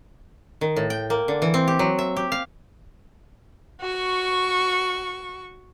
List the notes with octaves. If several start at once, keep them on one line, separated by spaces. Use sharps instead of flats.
D#3
A2
G5
A#3
D3
E3
C4
G4
F#3
E5
G4
F5
F#4 C#6